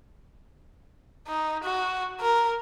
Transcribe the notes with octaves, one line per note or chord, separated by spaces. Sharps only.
D#4
F#4
A#4